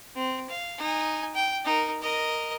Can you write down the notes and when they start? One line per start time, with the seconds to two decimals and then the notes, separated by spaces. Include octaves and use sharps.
0.15 C4
0.49 F5
0.78 D#4 G#5
1.35 G5
1.65 D#4 A#4
2.02 A#4 D#5